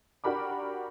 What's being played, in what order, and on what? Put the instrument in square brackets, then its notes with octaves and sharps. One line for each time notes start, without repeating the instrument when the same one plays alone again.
[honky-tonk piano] D4 F#4 G4 A#4 B5 D6